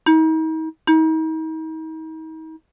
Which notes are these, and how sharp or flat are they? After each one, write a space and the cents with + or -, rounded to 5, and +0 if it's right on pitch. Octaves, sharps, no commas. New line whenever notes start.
D#4 +40
D#4 +40